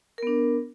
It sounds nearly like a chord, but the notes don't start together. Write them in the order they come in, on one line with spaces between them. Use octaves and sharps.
A#4 B3 D4